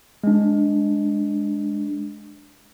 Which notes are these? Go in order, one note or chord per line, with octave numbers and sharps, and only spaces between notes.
G#3 D4